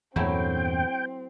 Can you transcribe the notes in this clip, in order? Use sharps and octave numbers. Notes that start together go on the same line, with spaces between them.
E2 G2 A#2 F#3 A3 C4 E4 G5